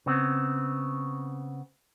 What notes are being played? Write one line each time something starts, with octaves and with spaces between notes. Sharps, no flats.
C#3 B3 C4